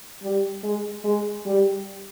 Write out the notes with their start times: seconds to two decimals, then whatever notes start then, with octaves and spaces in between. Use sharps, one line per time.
0.23 G3
0.63 G#3
1.04 G#3
1.46 G3